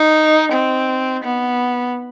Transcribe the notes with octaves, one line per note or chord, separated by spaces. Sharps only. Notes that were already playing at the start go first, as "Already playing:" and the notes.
Already playing: D#4
C4
B3